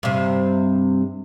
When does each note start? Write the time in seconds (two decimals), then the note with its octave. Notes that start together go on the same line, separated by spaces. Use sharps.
0.03 G2 C3